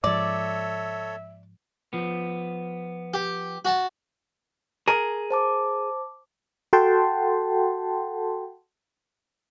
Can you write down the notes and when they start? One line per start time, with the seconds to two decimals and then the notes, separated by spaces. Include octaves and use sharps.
0.04 G#2 F3 A4 C#5 D5 E5
1.93 F3 B3
3.14 G4
3.65 F#4 A5
4.88 G#4 A#4
5.31 C5 A5 D6
6.73 F#4 A4 F#5 G5 A5 C6